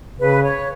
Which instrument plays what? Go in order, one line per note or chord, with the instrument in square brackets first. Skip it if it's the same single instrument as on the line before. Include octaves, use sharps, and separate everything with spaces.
[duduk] C#3 [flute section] B4
[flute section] C#5